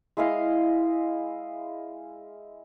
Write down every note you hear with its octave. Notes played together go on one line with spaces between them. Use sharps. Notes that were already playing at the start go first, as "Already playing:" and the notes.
G#3 E4 D#5 F5